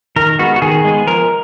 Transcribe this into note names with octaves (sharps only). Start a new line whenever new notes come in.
D#3 A#4
G#3 B3 F#4
F#4
D#3 G#4
G#3 B3
F3 A#4